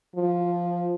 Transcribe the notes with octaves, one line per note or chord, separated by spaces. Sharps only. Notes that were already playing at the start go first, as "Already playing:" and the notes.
F3